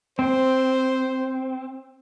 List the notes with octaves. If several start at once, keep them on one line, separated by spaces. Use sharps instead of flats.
C4 C5